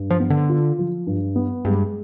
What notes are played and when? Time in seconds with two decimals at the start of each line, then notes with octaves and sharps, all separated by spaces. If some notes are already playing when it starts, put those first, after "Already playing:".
Already playing: G2
0.10 F3
0.20 B3
0.30 D3
0.49 F4
0.79 F3
1.07 G2
1.36 B3
1.65 G2 G#3